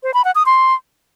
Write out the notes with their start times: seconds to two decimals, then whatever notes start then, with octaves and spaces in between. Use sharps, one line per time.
0.03 C5
0.14 B5
0.24 F#5
0.35 D#6
0.46 C6